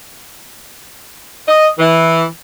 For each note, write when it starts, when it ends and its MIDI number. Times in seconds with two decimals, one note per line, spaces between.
1.47 1.68 75
1.78 2.25 52